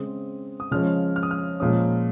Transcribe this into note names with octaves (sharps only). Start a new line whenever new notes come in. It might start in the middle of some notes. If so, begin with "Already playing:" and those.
Already playing: C#3 G#3 C4 D#6
D#6
C#3 F3 G#3 C#4 F6
F6
D#6
F6
A#2 F3 G#3 C#4 D#6